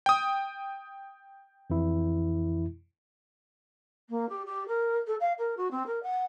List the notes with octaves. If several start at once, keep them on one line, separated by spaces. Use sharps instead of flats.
G5 D#6
F2 E3 E4
A#3
G4
G4
A#4
A4
F5
A#4
F#4
C4
A#4
F#5